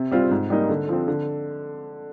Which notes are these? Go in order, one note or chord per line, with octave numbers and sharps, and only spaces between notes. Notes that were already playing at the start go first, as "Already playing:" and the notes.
Already playing: C3
G3 C4 F4
G#2
G3 A#3 D#4
D3
F3 C4
D3